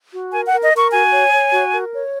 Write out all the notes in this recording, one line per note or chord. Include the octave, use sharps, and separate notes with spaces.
F#4
A#4 G#5
F#5
A#4
D#5
A#4 C#6
F#4 G#5
C#5
C#5
F#4
A#4
C#5